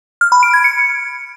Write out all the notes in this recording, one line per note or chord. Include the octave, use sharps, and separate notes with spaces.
F6
B5
D7
G#6
C#7